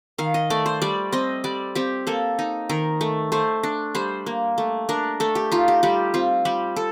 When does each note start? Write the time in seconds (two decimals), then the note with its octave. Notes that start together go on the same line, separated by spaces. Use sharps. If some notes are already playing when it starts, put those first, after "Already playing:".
0.18 D#3 F5
0.34 D#5
0.50 A3 D5
0.66 C5
0.82 G3 D5
1.12 C4 D#5
1.44 G3 D5
1.75 C4 G4
2.07 A#3 A4
2.39 D#4
2.69 D#3 A#4
3.01 A3
3.32 A3 C5
3.63 D4
3.95 G3 C5
4.26 A#3
4.58 A3
4.89 D4 A#4
5.20 A3 A4
5.35 G4
5.52 D#4 F4
5.68 G4
5.83 G3 G4
6.14 C4 F4
6.45 G3 G4
6.76 A4